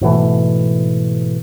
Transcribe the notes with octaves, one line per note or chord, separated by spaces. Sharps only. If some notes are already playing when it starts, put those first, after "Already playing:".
G#2 B2 E3 A3